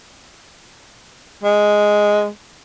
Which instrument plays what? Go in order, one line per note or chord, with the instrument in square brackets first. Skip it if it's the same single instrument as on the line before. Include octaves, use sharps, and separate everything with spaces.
[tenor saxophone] G#3